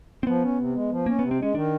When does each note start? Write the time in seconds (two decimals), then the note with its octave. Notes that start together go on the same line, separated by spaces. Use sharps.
0.23 C4
0.27 F3 B3
0.43 C#4
0.59 C3
0.75 G#3
0.91 F3
1.06 A#3 C#4
1.19 C3 B3
1.31 C4
1.39 G#3 C#4
1.55 D#3 D4